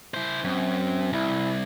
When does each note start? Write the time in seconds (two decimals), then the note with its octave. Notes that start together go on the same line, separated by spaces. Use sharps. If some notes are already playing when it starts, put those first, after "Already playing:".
0.14 E4 C5
0.44 F#2 C4
1.13 C2 E4